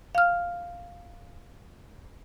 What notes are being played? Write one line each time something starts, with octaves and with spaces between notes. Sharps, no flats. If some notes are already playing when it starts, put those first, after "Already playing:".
F5 F6